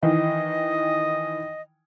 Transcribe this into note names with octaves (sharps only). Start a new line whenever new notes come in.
D#3 E3 D#5